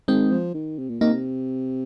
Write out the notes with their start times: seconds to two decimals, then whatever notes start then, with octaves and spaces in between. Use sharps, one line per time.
0.08 D#3 G#3 C4
0.31 F3
0.54 D#3
0.78 C3
0.89 A#2
1.00 C3 A#3 D#4